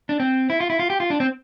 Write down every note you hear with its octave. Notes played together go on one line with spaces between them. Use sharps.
D4
C4
E4
F4
E4
F4
G4
F4
D4
C4